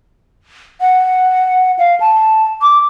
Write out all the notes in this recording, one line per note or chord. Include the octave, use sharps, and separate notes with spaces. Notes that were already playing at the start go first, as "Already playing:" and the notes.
F#5
F5
A5
D6